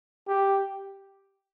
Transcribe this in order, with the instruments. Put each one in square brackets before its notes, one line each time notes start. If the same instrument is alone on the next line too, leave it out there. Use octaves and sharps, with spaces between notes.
[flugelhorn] G4